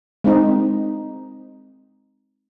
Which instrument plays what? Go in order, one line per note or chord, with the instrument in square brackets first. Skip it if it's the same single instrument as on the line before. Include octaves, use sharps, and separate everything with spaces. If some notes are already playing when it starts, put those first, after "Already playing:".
[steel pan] G#3 C4 D#4